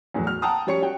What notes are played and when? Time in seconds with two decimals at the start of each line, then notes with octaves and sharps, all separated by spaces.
0.14 E2 A2 F#3
0.27 F6
0.42 F#5 G5 A5 A#5 D#6
0.67 G3 C#4 C#5 C#6 C#7
0.82 F#4 G5